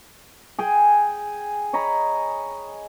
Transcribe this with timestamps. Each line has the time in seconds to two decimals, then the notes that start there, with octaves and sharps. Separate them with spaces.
0.59 G#4 G5 G#5
1.73 C#5 D#5 A#5 B5